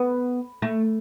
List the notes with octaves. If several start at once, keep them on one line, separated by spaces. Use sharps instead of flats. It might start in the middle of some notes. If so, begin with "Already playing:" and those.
Already playing: B3
A3